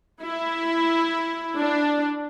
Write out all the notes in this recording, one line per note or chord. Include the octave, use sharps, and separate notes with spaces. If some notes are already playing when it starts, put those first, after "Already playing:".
E4
D4